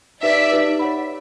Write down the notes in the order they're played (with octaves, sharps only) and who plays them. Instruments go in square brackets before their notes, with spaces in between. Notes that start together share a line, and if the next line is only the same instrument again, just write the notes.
[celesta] D#4 G4 B4 [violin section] D5 E5
[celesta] D#4 G4 B4
C#5 F#5 B5